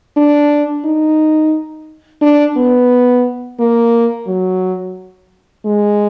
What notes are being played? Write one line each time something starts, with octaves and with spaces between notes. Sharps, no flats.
D4
D#4
D4
B3
A#3
F#3
G#3